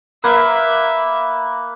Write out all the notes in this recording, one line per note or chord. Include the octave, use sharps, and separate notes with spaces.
A#3 B4 E5